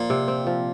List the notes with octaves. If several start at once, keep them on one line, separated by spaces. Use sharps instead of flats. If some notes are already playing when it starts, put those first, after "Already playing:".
Already playing: A#2 F3
C3
C4
F3